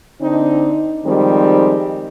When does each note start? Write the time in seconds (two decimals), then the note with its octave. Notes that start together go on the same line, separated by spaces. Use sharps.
0.21 D3 C4 D4 D#4
1.05 D#3 F3 G3 G#3 C4